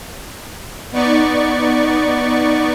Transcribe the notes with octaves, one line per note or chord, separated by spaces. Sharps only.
B3 D#4 D5 C#6